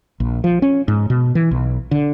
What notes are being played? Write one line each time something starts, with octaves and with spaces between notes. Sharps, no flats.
A#1
F3
C#4
G#2
B2
E3
B1
D3